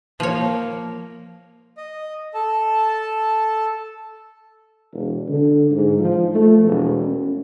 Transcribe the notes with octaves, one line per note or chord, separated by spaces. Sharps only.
F3 A#3 C#5
D#5
A4 A5
E1
D3
G#2
F3
A3
E1
C#4